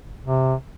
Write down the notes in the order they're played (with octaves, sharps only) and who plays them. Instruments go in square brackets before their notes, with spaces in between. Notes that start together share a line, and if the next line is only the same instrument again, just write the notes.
[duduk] C3